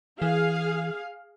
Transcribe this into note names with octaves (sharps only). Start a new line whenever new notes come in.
E3 G#4 F5